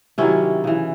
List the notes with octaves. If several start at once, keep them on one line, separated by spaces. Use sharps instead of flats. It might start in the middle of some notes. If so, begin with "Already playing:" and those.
C3 D#3 F#3 C#4 E4
C#3 E3